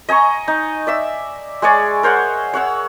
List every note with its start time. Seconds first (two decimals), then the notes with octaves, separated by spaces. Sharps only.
0.09 D#5 G#5 A#5 C#6
0.48 D#4
0.87 D5 E5 E6
1.62 G#3 G#4 C#5 D5
2.03 A#4 C5 C#5 F#5
2.53 C#5 F#5 E6